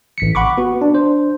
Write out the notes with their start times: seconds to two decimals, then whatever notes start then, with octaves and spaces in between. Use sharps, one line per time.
0.18 A1 B6 C#7
0.35 F#5 B5 C#6 D6
0.58 B3 F#4
0.81 D4
0.94 D4 C5